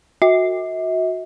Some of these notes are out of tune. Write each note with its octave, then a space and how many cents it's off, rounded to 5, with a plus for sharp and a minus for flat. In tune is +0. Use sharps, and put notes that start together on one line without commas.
F#4 -15 E5 -45